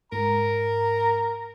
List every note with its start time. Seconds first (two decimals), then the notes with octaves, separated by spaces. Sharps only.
0.12 G#2 A#4 A#5